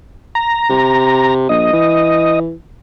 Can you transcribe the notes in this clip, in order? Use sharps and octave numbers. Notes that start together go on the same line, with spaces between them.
A#5
C3
A#1 D#5
E3